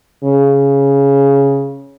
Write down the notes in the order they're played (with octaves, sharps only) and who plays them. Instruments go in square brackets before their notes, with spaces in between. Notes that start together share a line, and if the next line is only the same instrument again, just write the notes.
[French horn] C#3